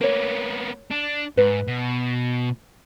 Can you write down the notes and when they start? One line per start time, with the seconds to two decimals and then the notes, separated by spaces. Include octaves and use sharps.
0.01 A#3 B3 A#4 C#5
0.91 D4
1.37 G#2 B4
1.68 B2